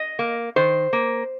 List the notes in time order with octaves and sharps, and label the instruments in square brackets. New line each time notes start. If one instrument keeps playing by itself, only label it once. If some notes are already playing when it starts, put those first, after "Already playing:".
Already playing: [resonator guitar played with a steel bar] D#5
A#3
D#3 C5
A#3